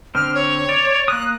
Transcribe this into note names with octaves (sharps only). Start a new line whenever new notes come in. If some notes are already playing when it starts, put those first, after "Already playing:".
D3 C4 F6
C#5
D5
A#3 D#6 F#6